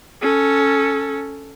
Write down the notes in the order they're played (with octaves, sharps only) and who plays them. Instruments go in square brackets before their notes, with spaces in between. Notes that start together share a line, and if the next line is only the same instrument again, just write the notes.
[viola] C#4 A4